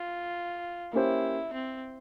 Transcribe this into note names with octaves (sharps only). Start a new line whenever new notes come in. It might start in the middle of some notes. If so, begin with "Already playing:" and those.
Already playing: F4
A#3 C#4 E4 G4 C5
C4